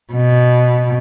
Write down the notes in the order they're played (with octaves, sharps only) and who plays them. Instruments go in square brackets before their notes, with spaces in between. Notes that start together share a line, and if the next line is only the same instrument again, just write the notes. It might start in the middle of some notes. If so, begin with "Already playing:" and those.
[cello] B2